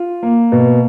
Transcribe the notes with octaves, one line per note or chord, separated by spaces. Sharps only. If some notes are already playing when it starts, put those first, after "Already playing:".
Already playing: F4
A#3
B2